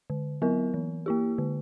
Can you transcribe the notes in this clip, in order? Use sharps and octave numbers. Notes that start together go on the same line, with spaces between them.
D3
F#3 B3 E4 A#4
E3
A#3 E4 G4
D3